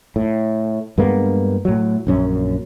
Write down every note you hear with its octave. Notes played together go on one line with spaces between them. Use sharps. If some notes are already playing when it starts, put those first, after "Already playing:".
A2
G2 G#3 A#3 B3
A2 F#3
A#1 F#2 C#4